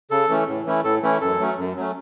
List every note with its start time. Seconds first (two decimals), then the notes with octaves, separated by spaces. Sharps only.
0.11 C#3 A4
0.29 E3 A3 C#4
0.48 A2
0.66 E3 A3 C#4 E4
0.84 A2 A4
1.03 E3 A3 C#4 E4
1.21 F#2 A4
1.40 F#3 A3 C#4
1.58 F#2
1.76 F#3 A3 C#4